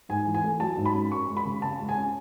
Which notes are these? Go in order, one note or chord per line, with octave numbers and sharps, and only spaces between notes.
G#2 G#5
E3
G#5
A3
F#3 A5
G#2
B5
C#4
F#2 C#6
G#3
B5
C#3
C#3 A5
G#3
G#5
C#4